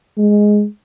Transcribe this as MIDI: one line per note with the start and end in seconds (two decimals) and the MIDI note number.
0.17 0.64 56